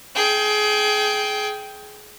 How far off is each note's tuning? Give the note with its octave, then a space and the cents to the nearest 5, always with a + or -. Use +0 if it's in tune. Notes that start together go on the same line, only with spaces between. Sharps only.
G#4 +25 G5 +0